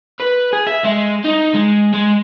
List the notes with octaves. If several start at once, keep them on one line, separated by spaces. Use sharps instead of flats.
B4
G#4
E5
G#3
D#4
G#3
G#3